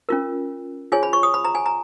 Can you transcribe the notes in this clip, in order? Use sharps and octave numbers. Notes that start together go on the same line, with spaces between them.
C#4 F4 A#4
F4 G#4 C#5 G#5
B5
C#6
D#6
B5
A#5
G#5
A#5